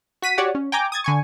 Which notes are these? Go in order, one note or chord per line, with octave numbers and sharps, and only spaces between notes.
F#4 B6 D#7
F#4 G4 C#5 D5 F#5
C#4
G5 G#5 A#5 D6
D#6 G#6 A6
D3 G#5 C#6